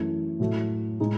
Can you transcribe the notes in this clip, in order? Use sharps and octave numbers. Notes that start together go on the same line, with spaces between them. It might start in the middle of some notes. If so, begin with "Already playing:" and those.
Already playing: F#2 E3 A3
A2 F#3 A3
A2 G#3 D#4